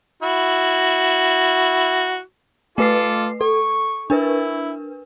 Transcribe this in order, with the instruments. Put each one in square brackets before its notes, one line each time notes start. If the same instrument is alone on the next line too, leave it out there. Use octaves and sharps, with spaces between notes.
[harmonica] E4 F#4
[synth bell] A3 B4 C7 [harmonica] F4 A4 D6
[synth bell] A4 [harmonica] C#6
[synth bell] D4 A#4 B4 [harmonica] E4